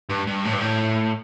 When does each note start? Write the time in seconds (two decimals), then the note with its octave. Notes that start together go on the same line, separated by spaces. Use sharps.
0.10 G2
0.27 G2
0.45 A2
0.53 G2
0.61 A2